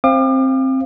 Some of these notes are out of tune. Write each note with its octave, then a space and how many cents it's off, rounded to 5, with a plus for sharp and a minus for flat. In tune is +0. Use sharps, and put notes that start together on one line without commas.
C4 +15 F5 -15 D6 +40